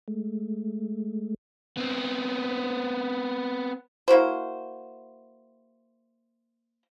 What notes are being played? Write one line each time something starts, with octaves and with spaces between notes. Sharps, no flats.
G#3 A3
B3 C4
A#3 E4 F#4 C5